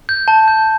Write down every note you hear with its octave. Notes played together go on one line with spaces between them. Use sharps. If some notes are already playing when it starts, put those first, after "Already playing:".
G6
A5
G6